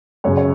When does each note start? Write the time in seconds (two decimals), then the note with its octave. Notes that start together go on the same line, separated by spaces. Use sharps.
0.24 F#2 C#3 C#5
0.37 C#5